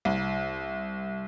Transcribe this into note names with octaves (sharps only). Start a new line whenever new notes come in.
C2